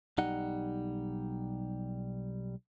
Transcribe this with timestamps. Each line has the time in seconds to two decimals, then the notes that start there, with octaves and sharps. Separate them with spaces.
0.18 B1 G3 D#4 F#5